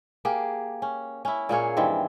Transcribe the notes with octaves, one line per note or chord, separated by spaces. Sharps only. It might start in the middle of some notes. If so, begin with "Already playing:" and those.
A#3 G4 G#4
C#4
C#4 E4
A#2 A#3 G#4 C#5
G2 D#3 E3 C4